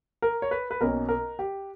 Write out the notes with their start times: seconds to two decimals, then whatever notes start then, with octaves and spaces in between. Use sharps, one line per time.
0.22 A#4
0.42 C#5
0.51 B4
0.71 B4
0.81 B1 B2 A#3 C#4 A#4
1.09 A#4
1.39 G4